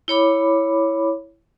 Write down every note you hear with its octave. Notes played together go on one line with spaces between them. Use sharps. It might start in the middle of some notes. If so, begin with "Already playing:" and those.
E4 C#5 B5 D6